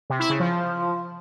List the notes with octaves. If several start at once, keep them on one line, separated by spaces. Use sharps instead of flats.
C3
E4
C#3
F3